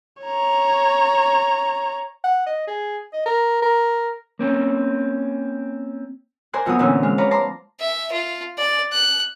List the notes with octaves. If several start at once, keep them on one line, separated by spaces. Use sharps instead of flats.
C#5 A#5
F#5
D#5
G#4
D#5
A#4
A#4
A#3 C4 C#4
A#4 C5 D5 G#5 C6 F#6
F2 F3 F#3 B3 F#5 D#6
A#2 D3 E3 F3 C4 C#4
G#3 F6
B4 C#5 D5 F5 A#5
A5 A#5 C6 D6
E5
F4
D5
F#6